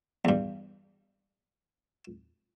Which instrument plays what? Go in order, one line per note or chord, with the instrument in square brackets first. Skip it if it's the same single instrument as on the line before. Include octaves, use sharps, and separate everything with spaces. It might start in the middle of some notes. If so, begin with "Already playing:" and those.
[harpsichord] E2 G2